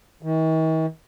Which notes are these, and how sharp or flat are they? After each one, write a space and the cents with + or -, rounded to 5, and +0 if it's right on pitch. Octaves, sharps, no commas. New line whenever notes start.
D#3 +45